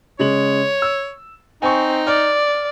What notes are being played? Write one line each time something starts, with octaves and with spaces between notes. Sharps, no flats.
C#3 G#3 C#5 F#7
E6
C4 D#4 G#5 C#6
D5 F6